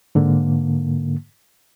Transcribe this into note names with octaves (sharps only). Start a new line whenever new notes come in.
G#2 D3 A#3